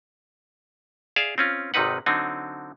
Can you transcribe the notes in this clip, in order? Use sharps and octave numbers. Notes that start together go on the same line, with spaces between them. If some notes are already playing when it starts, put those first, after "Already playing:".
G#4 D5 E5 F5
C4 C#4 F4
G#1 C3 D#3 D#4 B4 F#5
D3 F#3 C4 D#4